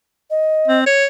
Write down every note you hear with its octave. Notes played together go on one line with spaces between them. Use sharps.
D#5
C4
C#5